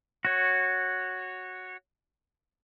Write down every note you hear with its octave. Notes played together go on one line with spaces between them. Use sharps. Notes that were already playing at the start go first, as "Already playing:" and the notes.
F#4 C#5